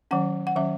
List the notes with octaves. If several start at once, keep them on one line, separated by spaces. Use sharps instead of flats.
D#3 F#3 C#4 F#5
F#5
D#3 F#3 C#4 E5